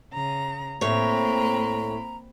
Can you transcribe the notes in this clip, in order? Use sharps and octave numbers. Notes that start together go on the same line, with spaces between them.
C#3 A#5
A2 A#3 C4 C#5 A#5 B5